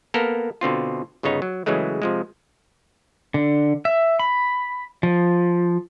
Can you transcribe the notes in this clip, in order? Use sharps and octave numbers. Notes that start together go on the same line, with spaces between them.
A#3 B3 A4 A#4
B2 D3 C4 F4
G1 C#3 B3 D#4 C#5
F#3
C#3 E3 F#3 G#3 A3
C3 F3 G#3
D3
E5
B5
F3